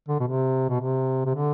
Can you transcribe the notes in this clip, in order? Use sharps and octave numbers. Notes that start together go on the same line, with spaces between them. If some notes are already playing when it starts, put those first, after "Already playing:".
D3
B2
C3
B2
C3
C3
D3